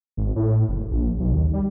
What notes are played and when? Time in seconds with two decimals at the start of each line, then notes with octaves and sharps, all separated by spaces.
0.17 G#1
0.36 A2
0.69 F#1
0.91 A#1
1.20 B1
1.33 D#2
1.53 G3